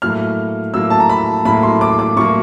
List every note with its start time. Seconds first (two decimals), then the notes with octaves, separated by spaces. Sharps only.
0.02 A2 F#3 A#3 F6
0.74 A2 F#3 A#3 E6
0.90 A5
1.00 A#5
1.10 B5
1.45 A2 F#3 A#3 B5
1.63 C6
1.81 D6
1.99 D6
2.16 A2 F#3 A#3 C#6